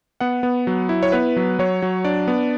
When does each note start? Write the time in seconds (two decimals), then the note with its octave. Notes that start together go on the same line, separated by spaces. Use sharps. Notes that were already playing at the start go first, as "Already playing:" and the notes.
0.20 B3 F#5
0.43 B3
0.67 F#3
0.89 E4
1.03 C#5
1.12 B3 B4
1.37 F#3
1.59 F#3 C#5
1.82 F#3
2.05 D4 D5
2.28 B3